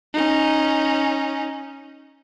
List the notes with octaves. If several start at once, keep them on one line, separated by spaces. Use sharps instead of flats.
C#4 D#4